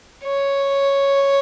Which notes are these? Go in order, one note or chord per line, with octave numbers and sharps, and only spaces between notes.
C#5